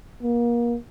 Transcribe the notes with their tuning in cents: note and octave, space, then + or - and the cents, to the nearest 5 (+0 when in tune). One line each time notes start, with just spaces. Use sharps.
A#3 +30